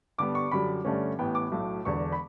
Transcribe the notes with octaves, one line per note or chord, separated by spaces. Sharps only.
G2 D3 G3 B3 D6
C#6
F#2 D3 G3 B5
G2 D3 A3 C#4
A1 A2 E3 B3 G5
D6
B1 A2 F#3 A3
E1 E2 D3 C#6
B5